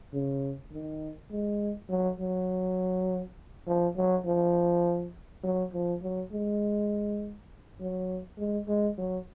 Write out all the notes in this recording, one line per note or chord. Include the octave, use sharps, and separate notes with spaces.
C#3
D#3
G#3
F#3
F#3
F3
F#3
F3
F#3
F3
F#3
G#3
F#3
G#3
G#3
F#3